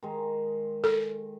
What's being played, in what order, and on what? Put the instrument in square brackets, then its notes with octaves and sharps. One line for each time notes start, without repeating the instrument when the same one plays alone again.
[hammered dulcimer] D#3 G#3
[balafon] A4